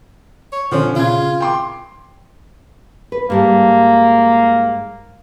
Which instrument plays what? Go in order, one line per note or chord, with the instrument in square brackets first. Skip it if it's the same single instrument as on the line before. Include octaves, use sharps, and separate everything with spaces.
[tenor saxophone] C#5
[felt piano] D3 C#4 [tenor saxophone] F3
[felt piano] C#3 G#6 [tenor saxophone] F4
[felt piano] G5 C6 D6
[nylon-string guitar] B4
[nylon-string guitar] G#2 G3 A5 [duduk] A#3